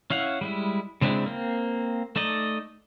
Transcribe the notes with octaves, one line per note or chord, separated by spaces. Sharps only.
C#4 E4 F5 F#5
G3 G#3 E4
C#3 G#3 C4 D4 E4
A#3 C4
A3 D#4 D5 D#5